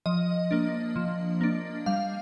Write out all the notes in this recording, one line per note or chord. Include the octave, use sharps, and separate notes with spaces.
F3 D#5
A#3 D4
F3
A#3 D4
G3 F5